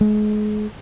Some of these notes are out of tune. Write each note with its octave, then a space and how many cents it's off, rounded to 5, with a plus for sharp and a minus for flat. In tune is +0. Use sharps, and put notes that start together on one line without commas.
G#3 +30